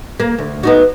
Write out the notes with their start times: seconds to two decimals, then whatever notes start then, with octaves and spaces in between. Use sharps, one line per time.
0.20 A#3
0.38 D2
0.63 B3 D#4 F#4